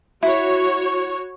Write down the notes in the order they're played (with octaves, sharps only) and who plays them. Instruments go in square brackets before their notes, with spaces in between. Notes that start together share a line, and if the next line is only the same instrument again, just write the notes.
[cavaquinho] E4 [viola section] F#4 C#5